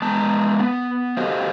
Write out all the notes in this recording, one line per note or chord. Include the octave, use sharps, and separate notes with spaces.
G#3 B3 A5 A#5
B3
F#4 G4 A4 C5 D#5 F5